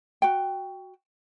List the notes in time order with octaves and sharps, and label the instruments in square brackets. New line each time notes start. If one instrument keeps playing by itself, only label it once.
[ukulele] F#4 G5